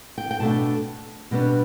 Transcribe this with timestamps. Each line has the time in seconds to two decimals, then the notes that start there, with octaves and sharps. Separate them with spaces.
0.18 G5
0.31 G5
0.40 B2 A3 D4 A5
1.31 B2 G3 B3 D4